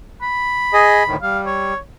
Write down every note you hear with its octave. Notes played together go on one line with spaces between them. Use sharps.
B5
G#4 D#5
D2 A2 D#3
G3 F5
C#5